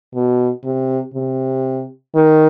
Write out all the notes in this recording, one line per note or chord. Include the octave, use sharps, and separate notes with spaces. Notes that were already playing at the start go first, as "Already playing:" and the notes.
B2
C3
C3
D#3